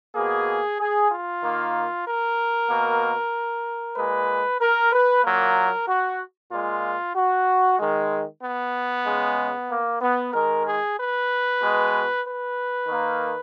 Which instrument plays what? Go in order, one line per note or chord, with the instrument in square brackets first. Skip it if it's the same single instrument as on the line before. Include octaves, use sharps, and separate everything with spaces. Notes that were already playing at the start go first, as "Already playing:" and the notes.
[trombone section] B2 A#3 G#4
G#4
F4
D#3 A#3
A#4
B2 A#3
A#2 G#3 B4
A#4
B4
A#2 F#3 A#3 A#4
F#4
A#2 G#3 F4
F#4
D#3 G#3
B3
C#3 G#3
A#3
B3
D#3 G#3 A#4
G#4
B4
B2 G#3
B4
D#3 A#3